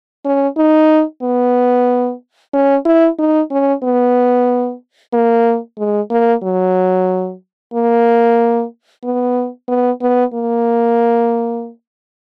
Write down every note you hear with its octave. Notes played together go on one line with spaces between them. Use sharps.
C#4
D#4
B3
C#4
E4
D#4
C#4
B3
A#3
G#3
A#3
F#3
A#3
B3
B3
B3
A#3